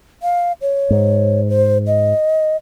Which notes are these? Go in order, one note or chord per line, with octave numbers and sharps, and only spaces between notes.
F5
C#5
G#2
C5
D#5